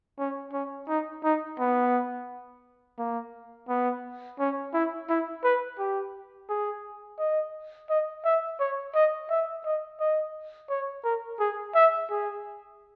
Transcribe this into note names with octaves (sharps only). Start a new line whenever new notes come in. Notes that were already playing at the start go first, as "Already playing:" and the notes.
C#4
C#4
D#4
D#4
B3
A#3
B3
C#4
E4
E4
B4
G4
G#4
D#5
D#5
E5
C#5
D#5
E5
D#5
D#5
C#5
A#4
G#4
E5
G#4